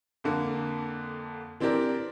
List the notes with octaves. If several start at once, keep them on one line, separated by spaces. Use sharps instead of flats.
F2 D3 A#3
E3 C4 D4 G4 A#4 D5